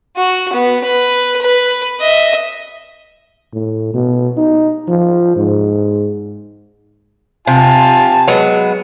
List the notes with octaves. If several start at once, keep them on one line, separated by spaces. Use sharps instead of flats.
F#4
B3
B4
B4
D#5 E5
A2
B2
D#4
F3
G#2
C3 F4 G#5 A5
F#3 G#3 B3